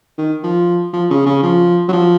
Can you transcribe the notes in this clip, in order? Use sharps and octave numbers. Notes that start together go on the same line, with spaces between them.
D#3
F3
F3
C#3
C#3
F3
F#3
F3